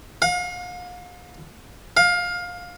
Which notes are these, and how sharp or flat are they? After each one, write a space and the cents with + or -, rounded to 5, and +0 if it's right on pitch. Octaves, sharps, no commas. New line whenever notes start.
F5 +40
F5 +20